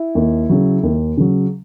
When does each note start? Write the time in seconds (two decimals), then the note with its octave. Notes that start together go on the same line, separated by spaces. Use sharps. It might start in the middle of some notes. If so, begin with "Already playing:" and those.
Already playing: E4
0.15 D#2
0.50 C#3 F#3
0.83 D#2
1.17 C#3 F#3